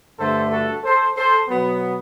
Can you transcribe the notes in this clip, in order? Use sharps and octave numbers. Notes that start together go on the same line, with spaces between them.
G2 D3 A3 A4 C5
F#4 A4
A4 C5
A4 C5
B2 F#3 B3